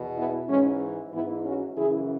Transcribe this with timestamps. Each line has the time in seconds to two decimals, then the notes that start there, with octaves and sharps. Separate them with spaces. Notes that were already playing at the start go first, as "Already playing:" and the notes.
Already playing: E2 B2
0.17 B3 E4
0.49 G#2 E3 G#3 C#4
1.13 G#2 E3 B3 E4
1.45 C#4 F#4
1.77 F#2 C#3 E3 E4 G#4